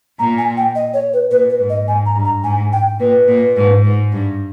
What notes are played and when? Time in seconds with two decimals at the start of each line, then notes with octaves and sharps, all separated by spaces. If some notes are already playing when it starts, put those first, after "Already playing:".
0.19 A#2 A#5
0.38 G#5
0.57 G5
0.75 D#5
0.94 C#5
1.13 B4
1.31 A#2 B4
1.50 B4
1.59 G#2
1.70 D#5
1.88 G#2 G#5
2.06 A#5
2.16 G2
2.25 A#5
2.44 G#2 G#5
2.73 G5
3.00 A#2 B4
3.28 A#2
3.57 G#2
3.84 G#2
4.12 G2